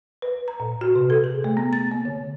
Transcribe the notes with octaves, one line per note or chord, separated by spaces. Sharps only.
B4
A#5
A#2
F#4
C3
A4
G#4
A3
B3
A6
A#3
D3